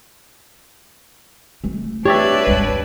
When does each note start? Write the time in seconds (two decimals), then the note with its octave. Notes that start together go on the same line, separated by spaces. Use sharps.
1.64 E3 A3
2.05 D4 G4 B4 C#5 D5 E5
2.47 G#1 D#2